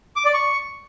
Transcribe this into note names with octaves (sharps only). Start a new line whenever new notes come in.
D6
D5
C#6